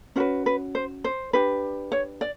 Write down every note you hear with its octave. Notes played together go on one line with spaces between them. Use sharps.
C#4 F#4 B4 C5
B4
C5
C5
D4 G4 B4
C#5
D5